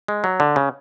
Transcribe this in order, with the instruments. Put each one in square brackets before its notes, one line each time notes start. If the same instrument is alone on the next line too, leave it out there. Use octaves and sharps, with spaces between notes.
[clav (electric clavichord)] G#3
F#3
D3
C#3